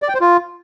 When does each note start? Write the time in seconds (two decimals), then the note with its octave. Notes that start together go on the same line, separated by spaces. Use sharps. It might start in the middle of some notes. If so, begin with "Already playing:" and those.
0.02 D5
0.08 G5
0.14 C5
0.20 F4